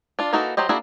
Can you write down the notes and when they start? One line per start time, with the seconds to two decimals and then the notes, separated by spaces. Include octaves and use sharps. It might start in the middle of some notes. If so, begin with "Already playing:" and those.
0.19 D4 F4
0.33 E3 A#3 D#4 F#4 A4
0.57 F#3 G4 C5 D#5
0.69 A#3 D4 E4 F#4 G#4